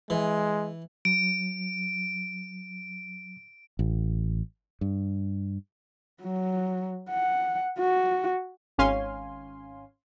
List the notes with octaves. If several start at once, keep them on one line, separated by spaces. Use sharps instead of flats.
E3 G#3
F#3 D7
A1
G2
F#3
F#5
F#4
G#1 C#4 F5 G#5 C6